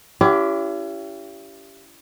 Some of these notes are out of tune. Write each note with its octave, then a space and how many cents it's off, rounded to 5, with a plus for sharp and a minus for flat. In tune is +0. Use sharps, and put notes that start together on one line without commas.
C#4 +45 E4 +40 G4 +0